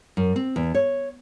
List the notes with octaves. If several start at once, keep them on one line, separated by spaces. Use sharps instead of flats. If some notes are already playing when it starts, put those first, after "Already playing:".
F#2
C4
E2
C#5